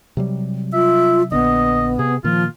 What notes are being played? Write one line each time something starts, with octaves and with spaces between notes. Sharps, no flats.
C3 F#3 G3
F4 E5
A#1 D3 B3 D#5
C3 G#4
A#2 D#3 F3 A#3 F4